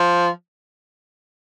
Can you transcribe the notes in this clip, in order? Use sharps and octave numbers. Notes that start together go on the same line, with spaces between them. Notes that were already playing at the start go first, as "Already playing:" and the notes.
Already playing: F3